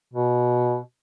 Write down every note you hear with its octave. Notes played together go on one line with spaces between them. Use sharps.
B2